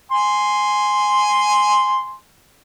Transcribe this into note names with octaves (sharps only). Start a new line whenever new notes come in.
G#5 C6